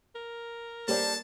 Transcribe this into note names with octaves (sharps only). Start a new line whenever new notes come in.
A#4
G3 A#3 D4 A4 C5 A5